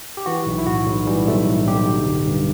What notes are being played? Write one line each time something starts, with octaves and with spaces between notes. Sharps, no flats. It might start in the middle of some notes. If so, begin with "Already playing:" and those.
G4
E3 F#4
B1
E4
A2 F#4
B1
E3 G3
B1 A3
A2
B1 G4
D3
G1
G2